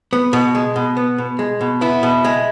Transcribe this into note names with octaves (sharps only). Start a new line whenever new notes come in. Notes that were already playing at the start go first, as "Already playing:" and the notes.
B3
B2
G#3
B2
B3
B2
G#3
B2
B3 E4
B2
G#3